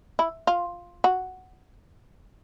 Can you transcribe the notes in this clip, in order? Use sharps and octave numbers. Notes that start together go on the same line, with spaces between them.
E4
F4
F#4